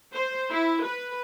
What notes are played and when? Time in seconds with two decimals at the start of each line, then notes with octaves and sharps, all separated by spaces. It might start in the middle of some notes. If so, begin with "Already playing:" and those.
0.14 C5
0.51 E4
0.86 B4